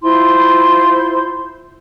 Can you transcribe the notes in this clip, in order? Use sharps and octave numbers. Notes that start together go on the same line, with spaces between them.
E4 F4 C5 C6